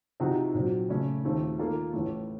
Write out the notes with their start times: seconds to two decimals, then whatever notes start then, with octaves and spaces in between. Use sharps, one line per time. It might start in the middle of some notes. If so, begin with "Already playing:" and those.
0.20 C3 F3 C4 D#4 F#4
0.55 A#2 F#3 C4
0.89 C#3 A3 C#4
1.24 D#2 D#3 A3 C4 F4
1.58 D#3 A#3 F4 A4
1.93 A1 A2 A3